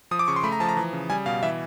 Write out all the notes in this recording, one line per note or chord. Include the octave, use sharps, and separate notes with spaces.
F3 D#6
D6
C#3 C#6
C6
A3 B5
A#5
F3 A5
A#5
E3
C#3
G3 G#5
B2 F5
E3 E5